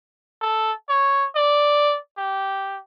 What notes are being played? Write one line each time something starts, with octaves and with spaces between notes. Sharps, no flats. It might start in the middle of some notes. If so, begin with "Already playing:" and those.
A4
C#5
D5
G4